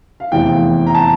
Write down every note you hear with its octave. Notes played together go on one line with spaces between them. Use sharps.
F5
F1 E2 E3 G5
A#5
A5